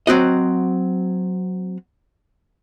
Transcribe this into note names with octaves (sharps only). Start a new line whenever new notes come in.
F#3 C4 F#4 D#5